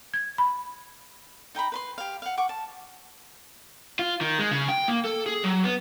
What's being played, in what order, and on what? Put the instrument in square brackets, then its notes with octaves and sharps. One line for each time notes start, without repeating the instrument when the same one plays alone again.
[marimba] G#6
B5
[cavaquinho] D#4 G5 A#5 B5
B4 B5 C6
G4 F5
F5 F#5
F#5 C#6 D6
A5
[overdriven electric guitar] F4
D#3
G#3
C#3
G5
A#3
A4
G#4
F#3
B3